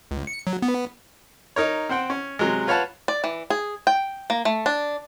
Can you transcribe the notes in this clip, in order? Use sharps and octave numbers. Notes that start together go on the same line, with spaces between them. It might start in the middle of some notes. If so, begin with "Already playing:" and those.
C#2
C#7
F#3
B3
D#4 A#4 C#5
C4 C5 F#5 G5
C#4
C3 F#3 G#3
F4 B4 C#5 F5 F#5 A5
D5
E3
G#4
G5
A#3
A3
D4